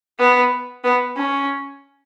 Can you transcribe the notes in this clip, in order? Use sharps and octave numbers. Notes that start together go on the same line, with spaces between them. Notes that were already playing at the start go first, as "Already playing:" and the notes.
B3
B3
C#4